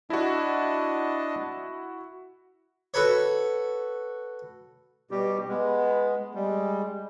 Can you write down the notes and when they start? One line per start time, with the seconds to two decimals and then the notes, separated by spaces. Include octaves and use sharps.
0.10 D4 E4 F#4 D#5 A5
2.94 F#4 A4 B4 C#5
5.11 B2 G3 G4
5.48 G#3 B3
6.35 G3 G#3